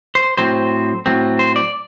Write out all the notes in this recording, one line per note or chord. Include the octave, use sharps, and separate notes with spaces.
C5
A2 F#3 C4 C5
A2 F#3 C4
C5
D5